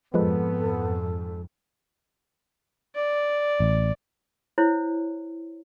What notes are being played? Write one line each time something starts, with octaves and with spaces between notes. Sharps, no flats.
F2 G#2 F3 G#3 B3 A4 B4
D5
A1
E4 C5 C#5